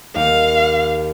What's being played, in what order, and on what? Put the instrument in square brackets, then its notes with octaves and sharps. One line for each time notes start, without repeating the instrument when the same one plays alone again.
[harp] D#2 [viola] F5